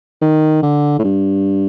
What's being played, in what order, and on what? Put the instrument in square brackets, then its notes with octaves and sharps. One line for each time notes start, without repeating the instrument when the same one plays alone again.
[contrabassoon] D#3
D3
A2
G2